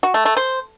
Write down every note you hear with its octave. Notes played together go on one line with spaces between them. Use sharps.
F#4
A3
A3
C5